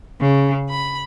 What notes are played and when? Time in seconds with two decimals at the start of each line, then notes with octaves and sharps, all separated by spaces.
0.20 C#3
0.69 B5